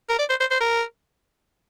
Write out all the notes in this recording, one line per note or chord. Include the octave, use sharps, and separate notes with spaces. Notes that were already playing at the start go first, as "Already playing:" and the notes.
A#4
D5
C5
C5
C5
A#4